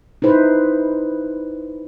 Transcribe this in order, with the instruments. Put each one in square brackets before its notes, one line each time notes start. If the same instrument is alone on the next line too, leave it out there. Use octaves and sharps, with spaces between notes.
[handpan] D#4 E4 B4 C5